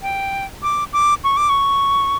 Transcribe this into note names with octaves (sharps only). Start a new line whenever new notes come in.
G5
D6
D6
C#6
D6
C#6